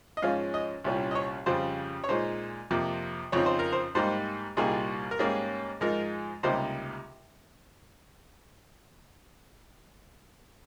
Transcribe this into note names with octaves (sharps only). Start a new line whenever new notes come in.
D#5
G#2 F3 G#3 C#4 F5
D#5
C2 A#2 G3 C#4
D#5
C#5
F2 C#3 G3 C5
C#5
A#2 G#3 D#4 C5
F2 C3 F3 A#3
F2 C#3 F3 C4 D#4 C#5
C5
A#4
C5
G#2 G3 A#3 D#4 C5
C2 A#2 G3 A#3 D#4 G#4
A#4
G#2 G3 A#3 C#4 G#4
G#2 F3 G#3 D#4 A#4
C#2 C3 G3 A#3 D#4 C5